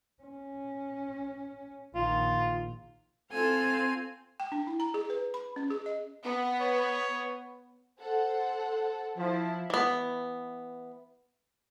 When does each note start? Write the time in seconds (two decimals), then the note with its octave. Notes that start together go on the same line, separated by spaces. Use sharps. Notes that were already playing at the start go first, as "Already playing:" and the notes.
0.23 C#4
1.95 A#1 D#3 F4
3.32 C4 F4 A4 F5 G#5
4.40 G5
4.52 D4
4.67 E4
4.80 A#5
4.94 G#4
5.10 B4
5.34 B5
5.56 C#4
5.70 G#4
5.86 D#5
6.23 B3
6.61 C#5
7.98 A4 C5 F#5
9.17 F3 E4
9.70 E3 B3